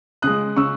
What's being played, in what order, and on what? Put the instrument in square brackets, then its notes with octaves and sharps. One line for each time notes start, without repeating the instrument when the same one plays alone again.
[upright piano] C#3 G#3 D#6 F#6
C#3 C#6 E6